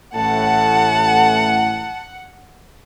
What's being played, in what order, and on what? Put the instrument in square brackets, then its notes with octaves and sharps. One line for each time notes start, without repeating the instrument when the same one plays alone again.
[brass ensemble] A1 A2 A3 [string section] F#5 [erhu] A5